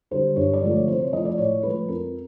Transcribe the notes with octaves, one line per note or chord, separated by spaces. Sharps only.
D3 G3 C5
G2 C#5
D5
D3 F3 A3
C#5
C3 C5
C#5
F3 A3 D#5
D5
A2 C#5
F3 A3 B4
F2 A#4